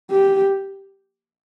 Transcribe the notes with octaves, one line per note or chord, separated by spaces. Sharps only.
G4